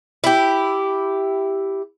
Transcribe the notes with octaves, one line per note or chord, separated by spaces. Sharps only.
E4 G4